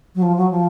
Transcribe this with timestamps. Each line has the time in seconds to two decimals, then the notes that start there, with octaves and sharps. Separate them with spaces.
0.15 F#3
0.22 F3
0.37 F#3
0.51 F3